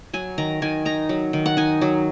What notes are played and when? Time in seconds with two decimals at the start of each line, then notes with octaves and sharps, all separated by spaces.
0.13 F#3 G#5
0.38 D#3 A#5
0.62 D#3 G#5
0.85 D#4 A#5
1.09 F#3
1.33 D#3
1.46 F#5
1.57 D#4 G#5
1.81 F#3